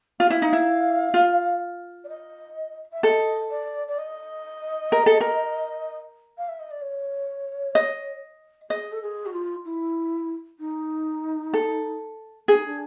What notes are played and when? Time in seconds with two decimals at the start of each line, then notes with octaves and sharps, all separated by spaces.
0.20 F4 F5
0.30 E4
0.42 D#4
0.53 E4
1.14 F4
2.04 D5
2.08 D#5
2.92 E5
3.03 A4 D#5
3.50 D5
3.87 D5
3.98 D#5
4.92 A#4
5.06 A4
5.21 A#4
6.37 F5
6.48 E5
6.59 D#5
6.70 D5
6.81 C#5
7.75 D#5
8.70 G#4 D#5
8.92 A4
9.02 G#4
9.26 F#4
9.33 F4
9.65 E4
10.59 D#4
11.53 A4
12.48 D4 G#4
12.56 D#4
12.65 D4